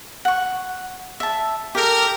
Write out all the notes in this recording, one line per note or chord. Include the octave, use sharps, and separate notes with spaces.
F#5 C#6
E5 A5
G4 A4 A#4